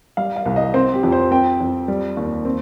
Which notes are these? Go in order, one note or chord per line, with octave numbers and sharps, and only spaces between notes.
G3 F5
F5
C2
D#5
C4 C5
G4
F2
C5
C4 G5
F2
G3
D#2
C4